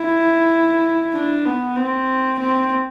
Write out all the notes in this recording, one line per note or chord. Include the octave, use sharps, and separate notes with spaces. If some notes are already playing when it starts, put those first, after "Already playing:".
Already playing: E4
D4
B3
C4
C4